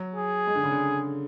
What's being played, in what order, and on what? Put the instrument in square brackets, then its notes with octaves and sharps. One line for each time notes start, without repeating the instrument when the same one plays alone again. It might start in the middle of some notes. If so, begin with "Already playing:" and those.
Already playing: [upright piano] F#3
[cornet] G#4
[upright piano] G#3
D3
C#3
D3